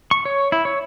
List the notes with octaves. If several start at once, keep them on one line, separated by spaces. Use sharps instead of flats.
C#6
C#5
E4
C#5